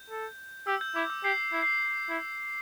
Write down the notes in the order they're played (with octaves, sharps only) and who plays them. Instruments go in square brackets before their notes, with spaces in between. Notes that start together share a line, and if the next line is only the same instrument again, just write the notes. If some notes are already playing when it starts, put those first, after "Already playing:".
Already playing: [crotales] G6
[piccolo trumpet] A4
[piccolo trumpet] G4 [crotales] E6
[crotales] G6
[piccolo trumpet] E4 [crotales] D6
[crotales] E6
[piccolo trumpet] G4 [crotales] C7
[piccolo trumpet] E4
[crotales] C7
[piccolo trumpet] E4